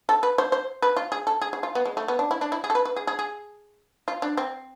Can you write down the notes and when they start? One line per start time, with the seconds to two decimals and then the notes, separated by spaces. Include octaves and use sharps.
0.09 A4
0.23 B4
0.38 C5
0.52 C5
0.82 B4
0.97 F4
1.12 G#4
1.27 A4
1.41 G#4
1.53 G#4
1.63 F4
1.75 B3
1.85 G#3
1.97 A3
2.08 B3
2.19 D4
2.31 E4
2.41 D4
2.52 E4
2.64 G#4
2.70 A4
2.75 B4
2.85 B4
2.96 G#4
3.07 G#4
3.19 G#4
4.08 F4
4.22 D4
4.37 C4